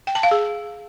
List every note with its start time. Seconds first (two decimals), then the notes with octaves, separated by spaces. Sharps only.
0.07 G5
0.15 A5
0.23 F5
0.31 G#4